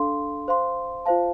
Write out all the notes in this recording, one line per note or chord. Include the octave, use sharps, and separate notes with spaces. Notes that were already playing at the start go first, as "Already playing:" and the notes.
Already playing: D4 A4 F5 C6
C5 F5 C6
F4 C5 F5 A5